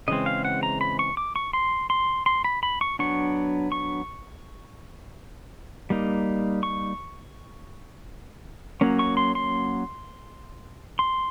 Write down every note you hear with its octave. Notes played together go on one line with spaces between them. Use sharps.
C#3 E3 G#3 C4 D#5
F5
F#5
A#5
B5
C#6
D6
C#6
C6
C6
C6
B5
B5
C#6
F#3 B3 D4 C#6
C#6
G3 A#3 D#4
C#6
F#3 A#3 C#4
C#6
C6
C6
C6